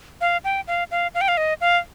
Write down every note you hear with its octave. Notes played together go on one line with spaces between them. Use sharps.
F5
G5
F5
F5
F5
G5
F5
D#5
F5